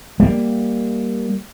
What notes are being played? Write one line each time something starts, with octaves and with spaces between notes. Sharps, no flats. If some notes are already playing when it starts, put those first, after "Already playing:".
G3 A#3